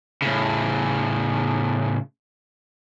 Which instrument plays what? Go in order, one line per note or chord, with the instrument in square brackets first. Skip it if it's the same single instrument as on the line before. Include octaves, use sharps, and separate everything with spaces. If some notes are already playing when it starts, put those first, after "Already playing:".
[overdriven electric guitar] A2 C#3